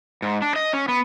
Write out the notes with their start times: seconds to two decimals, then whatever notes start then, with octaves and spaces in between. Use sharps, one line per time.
0.22 G#2
0.42 D4
0.56 D#5
0.73 C#4
0.88 B3